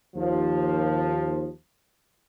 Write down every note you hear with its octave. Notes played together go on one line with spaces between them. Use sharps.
D#2 F3